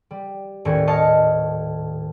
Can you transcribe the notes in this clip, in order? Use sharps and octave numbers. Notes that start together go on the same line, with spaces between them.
G3
D#1 A2 G#5 C#6
D#5 F5 A5 C#6